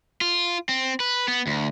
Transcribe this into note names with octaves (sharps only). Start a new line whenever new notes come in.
F4
C4
B4
B3
D2